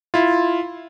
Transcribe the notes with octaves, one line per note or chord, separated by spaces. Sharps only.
E4 F4